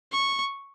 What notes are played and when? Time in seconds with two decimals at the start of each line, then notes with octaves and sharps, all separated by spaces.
0.12 C#6